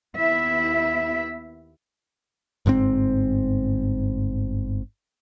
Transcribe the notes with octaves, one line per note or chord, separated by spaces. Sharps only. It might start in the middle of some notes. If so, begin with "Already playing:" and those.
D#2 B3 E4 E5
G1 G#2 C#3 C4